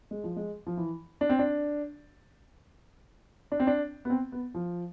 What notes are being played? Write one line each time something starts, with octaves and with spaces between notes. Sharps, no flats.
G#3
F3
G#3
F3
E3
D4
C4
D4
D4
C4
D4
B3
C4
B3
F3